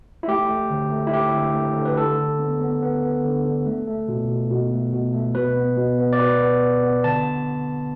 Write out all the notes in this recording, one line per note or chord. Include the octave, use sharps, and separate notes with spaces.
E4
A3 G4
A3
D3
A3
E4
A3 G4
D3
A3
D3
B4
D3 A4
D3
B3
B3
B3
B3
D3
D3
A3
A3
B2
B2
B2
A3
B2
A3
B2 B4
B3
B2
B3
D5
B2 B4
B3
B3
B3
D3 A5